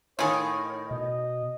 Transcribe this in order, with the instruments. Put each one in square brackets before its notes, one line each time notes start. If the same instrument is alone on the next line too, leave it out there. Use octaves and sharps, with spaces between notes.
[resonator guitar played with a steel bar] A2 D#3 [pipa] F4 G#4 [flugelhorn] C#5
[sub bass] B2 [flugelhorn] D#5